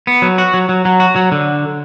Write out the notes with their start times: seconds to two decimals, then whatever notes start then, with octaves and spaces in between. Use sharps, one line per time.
0.07 B3
0.22 F#3
0.38 F#4
0.54 F#3
0.69 F#3
0.85 F#3
1.00 F#4
1.16 F#3
1.32 D3